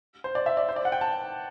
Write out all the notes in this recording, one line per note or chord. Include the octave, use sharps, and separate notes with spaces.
C5
D5
E5
D5
C5
D5
F#5
G5
A5